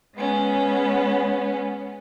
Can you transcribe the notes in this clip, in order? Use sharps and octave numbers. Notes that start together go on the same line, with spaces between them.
G#3 B3 C#4